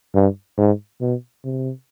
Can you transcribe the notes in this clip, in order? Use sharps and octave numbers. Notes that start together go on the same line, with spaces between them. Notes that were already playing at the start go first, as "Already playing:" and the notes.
G2
G#2
B2
C3